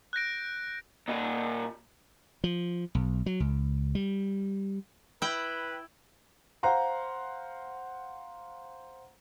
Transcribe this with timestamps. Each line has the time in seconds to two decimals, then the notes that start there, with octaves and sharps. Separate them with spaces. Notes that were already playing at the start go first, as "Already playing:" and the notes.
0.13 F#6 G6 A#6 D7
1.08 A#2 D#5
2.44 F3
2.95 B1
3.26 F#3
3.40 C#2
3.95 G3
5.22 E4 B4 G5
6.63 C5 F5 F#5 A#5 C6